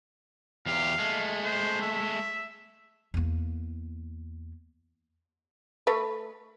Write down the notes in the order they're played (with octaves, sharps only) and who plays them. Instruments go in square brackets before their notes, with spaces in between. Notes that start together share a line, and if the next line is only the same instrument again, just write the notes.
[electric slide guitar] E2 G4 [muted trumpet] F5
[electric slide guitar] G#3 A3
[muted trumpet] C5
E5
[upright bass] E2 A#3
[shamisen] A3 B4